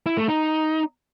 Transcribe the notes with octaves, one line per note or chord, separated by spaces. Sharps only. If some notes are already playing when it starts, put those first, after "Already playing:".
E4
A3
D#4